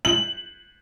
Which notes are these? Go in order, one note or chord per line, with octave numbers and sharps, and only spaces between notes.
F#7